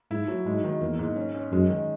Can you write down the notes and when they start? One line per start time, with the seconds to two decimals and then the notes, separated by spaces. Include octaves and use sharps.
0.11 G#2 E4
0.28 F#3
0.46 G#2 G#3
0.64 D#3
0.81 E2 A#3
0.99 G#2
1.16 C#4
1.35 C#4
1.52 F#2 G#3
1.70 D#3